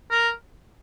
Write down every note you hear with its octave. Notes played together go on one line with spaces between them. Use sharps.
A#4